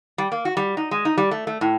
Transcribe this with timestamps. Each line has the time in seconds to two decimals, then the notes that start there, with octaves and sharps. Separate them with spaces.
0.18 G3
0.32 A#3
0.45 F#4
0.57 G3
0.77 D#4
0.91 G#3
1.05 D#4
1.17 G3
1.31 A3
1.47 A3
1.61 A2